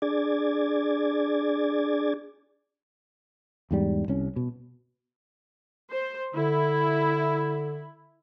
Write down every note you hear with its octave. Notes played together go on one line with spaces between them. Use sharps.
D4 G#4 D5 D6 G#6 A6
E2 G#2 G3
C2 C#4
B2
C5
D3 E4